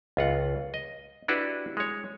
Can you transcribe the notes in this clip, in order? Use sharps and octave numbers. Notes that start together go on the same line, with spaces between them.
C#2 F4 F#5
D#5
D4 E4 F#4 G4 B4
G#3 C#5